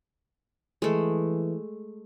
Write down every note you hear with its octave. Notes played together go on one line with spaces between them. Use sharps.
E3 G#3 A3